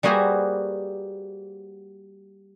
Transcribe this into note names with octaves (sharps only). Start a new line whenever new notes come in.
G3 A#3 F#4 G#4 B4 C5